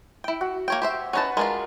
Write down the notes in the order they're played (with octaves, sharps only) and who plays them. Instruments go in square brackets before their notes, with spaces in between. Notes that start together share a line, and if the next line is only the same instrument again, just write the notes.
[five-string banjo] E4 G5
[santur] F#4
[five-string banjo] A#3 C#5 G5
G4 C5 E5
[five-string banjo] C#4 D#4 A5 [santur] B4 F#5
[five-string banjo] G#3 D4 F4 [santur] A#4